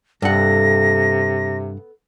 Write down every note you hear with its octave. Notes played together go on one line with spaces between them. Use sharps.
G2 C3 B3 A4 F#5 A#6